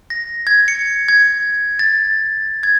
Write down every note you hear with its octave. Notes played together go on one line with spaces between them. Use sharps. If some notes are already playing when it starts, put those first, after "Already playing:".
A#6
G#6
C#7
G#6
A6
G#6